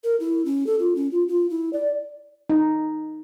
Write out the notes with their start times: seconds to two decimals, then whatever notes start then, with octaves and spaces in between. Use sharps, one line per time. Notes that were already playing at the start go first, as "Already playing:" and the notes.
0.04 A#4
0.20 E4
0.45 C#4
0.67 A4
0.79 F4
0.96 C#4
1.11 F4
1.28 F4
1.50 E4
1.73 D5
2.50 D#4